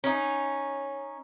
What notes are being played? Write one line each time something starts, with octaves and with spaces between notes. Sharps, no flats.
C#4 D#4